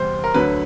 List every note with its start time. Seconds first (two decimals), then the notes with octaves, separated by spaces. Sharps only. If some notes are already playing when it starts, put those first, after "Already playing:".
Already playing: E2 C3 G3 C5
0.24 A#4
0.34 D2 D3 F#3 B4